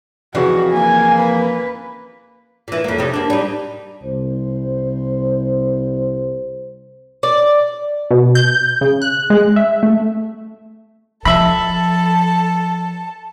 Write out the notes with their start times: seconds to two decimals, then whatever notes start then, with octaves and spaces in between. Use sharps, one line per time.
0.35 F2 C#3 E3 F#4
0.74 A#3 G#5
1.20 B4
2.68 A#2 E3
2.84 F2 A#3
2.98 C3 C4 D#4
3.14 A#3 D4
3.30 G3 D#4
4.02 C2 C5
7.23 D5
8.11 B2
8.35 G6
8.81 C#3
9.02 F#6
9.30 G#3
9.56 E5
9.83 A3
11.25 F3 A4 E5 A5 B5